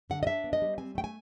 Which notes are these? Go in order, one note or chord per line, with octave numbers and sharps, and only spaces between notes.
D3 F#5
D#5
D4 E5
B3
D#5
G3
C4 G#5
A3 G5
G#5